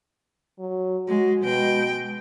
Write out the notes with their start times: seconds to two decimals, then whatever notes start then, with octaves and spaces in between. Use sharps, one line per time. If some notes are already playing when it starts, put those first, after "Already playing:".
0.59 F#3
1.08 G#3 F#4
1.43 B2 G#3 G5